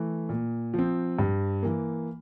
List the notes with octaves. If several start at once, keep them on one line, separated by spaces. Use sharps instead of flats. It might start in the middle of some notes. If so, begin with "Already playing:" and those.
Already playing: E3 A3
A#2
F3 C4
G2
E3 A#3